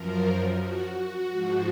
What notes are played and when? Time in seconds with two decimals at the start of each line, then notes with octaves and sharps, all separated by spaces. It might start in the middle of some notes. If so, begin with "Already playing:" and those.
Already playing: F#2 F3 A#4
0.58 F#4
0.94 F#4
1.29 G#2 F3